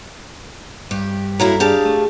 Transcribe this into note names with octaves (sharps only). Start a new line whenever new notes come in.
G2 G4
F#3 A#3 E4 A4 A#5
D4 G4 G#4 D5 F5 A5
A3